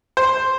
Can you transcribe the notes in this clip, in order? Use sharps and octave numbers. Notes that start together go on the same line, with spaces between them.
C5